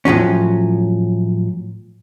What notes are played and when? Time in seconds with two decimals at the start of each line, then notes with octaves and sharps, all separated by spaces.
0.05 A2 F3 F#3 C#4